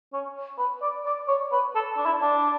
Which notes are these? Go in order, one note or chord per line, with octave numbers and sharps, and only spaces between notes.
C#4
B4
D5
D5
C#5
B4
A4
D4
E4
D4